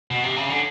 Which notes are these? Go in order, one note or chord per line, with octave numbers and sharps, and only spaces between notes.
B2
C3
C#3
D3